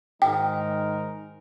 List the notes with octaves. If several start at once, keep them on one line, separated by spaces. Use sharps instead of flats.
G#2 D#3 G#3 D#4 A#4 G5